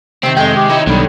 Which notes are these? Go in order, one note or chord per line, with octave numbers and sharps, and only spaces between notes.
C3 D#3 C4
F2 G#3 G5
G4
D#4 E4 C#5
B1 D3 D#3 G3